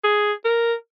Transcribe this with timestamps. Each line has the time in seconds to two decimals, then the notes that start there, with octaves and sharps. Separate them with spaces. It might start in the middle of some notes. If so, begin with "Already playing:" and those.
0.04 G#4
0.45 A#4